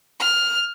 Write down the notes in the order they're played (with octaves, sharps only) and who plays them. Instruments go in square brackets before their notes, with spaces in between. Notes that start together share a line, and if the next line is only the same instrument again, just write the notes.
[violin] F6